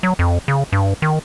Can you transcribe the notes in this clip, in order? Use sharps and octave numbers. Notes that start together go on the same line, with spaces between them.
F#3
F2
C#3
G2
D#3